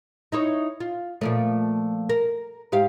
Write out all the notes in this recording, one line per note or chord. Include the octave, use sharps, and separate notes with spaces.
D#4 E4 C#5
F4
A#2 F3 A3
A#4
G#2 G4 F5